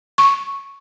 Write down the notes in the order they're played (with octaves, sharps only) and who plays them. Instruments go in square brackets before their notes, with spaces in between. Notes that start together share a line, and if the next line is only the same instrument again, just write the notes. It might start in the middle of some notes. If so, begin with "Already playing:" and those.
[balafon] C#6